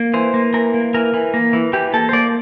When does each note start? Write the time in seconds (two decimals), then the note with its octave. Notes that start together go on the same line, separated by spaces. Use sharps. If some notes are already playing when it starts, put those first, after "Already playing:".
Already playing: A#3
0.14 E3 C5
0.34 A#3
0.54 E3 A#4
0.74 A#3
0.94 E3 A#4
1.14 E3
1.34 A#3
1.53 E3
1.73 E3 G4
1.94 A#3 A4
2.09 C5
2.13 A#3 D5